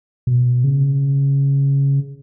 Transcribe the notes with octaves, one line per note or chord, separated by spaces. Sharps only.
B2
C#3